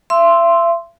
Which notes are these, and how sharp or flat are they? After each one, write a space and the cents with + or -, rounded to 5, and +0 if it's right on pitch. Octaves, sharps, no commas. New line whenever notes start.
E5 +40 C6 +0 E6 +0